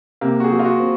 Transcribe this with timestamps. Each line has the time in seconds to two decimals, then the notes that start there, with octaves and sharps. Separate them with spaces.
0.21 C3 A#3
0.40 F#4
0.44 G#4
0.51 F#3
0.59 F4
0.65 F#4
0.80 C4